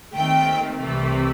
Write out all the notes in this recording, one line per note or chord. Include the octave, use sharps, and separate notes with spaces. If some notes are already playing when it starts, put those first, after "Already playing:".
D#2 D#3 A3 C4 G5
C2 C3 E3 A3